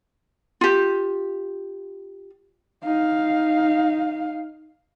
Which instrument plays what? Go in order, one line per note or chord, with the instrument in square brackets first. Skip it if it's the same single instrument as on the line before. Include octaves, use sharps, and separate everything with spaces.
[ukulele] F4 G4
[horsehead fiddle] D#4 F5